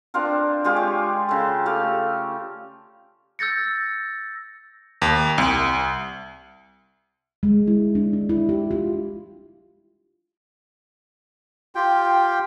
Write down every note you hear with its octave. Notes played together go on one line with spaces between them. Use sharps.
C4 D4 F4 A#4
G#3 F4 G4 G#4
C#5
C#3 A4
A3 G4 F5
E6 G6 A6 A#6 C#7
D#2
C2
G#3
E4
D4
D#4
E4
G4
F4
F4 G4 G5